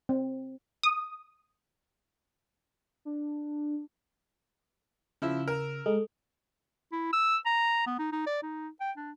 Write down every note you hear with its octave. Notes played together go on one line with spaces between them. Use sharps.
C4
D#6
D4
C#3 F3 E4 E6
A#4
G#3 A4
E4
E6
A#5
B3
D#4
D#4
D5
D#4
G5
D4